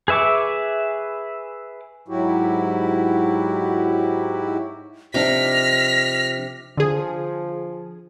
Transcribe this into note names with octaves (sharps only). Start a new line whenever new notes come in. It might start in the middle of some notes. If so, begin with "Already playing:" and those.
G#4 B4 E5 C#6 D6
G#2 F#3 E4 F#4 G4
C3 F3 D4 D#4 D6 F6 A#6 B6
D3 F3 G#4